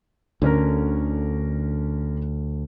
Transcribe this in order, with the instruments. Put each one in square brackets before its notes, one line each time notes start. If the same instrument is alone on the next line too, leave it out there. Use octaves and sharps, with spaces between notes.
[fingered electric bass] D2 [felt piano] D3 C#4 A#4